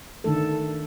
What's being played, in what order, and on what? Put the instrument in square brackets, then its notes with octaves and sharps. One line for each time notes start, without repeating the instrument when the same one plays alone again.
[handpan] D3 D#3 A3 A4